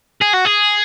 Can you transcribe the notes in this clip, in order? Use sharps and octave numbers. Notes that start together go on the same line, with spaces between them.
G#4
F#4
G#4